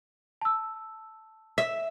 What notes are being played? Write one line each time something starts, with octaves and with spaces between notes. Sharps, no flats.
A5 E6
E5